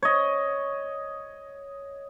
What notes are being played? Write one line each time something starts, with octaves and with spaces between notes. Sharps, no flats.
C#5 D#5